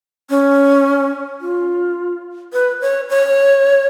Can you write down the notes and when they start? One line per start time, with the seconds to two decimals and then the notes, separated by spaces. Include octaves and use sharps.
0.30 C#4
1.41 F4
2.53 B4
2.81 C#5
3.10 C#5